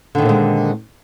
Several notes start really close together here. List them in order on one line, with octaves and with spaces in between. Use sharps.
D3 D#3 A#2 C4 G#3